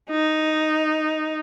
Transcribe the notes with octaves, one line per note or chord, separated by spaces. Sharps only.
D#4